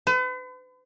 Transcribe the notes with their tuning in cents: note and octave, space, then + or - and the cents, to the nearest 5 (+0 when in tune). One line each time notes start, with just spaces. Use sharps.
B4 +45